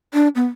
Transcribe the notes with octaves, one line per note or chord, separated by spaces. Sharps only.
D4
B3